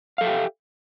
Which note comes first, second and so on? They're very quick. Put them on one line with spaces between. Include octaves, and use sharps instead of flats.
F5 A4 E5 G4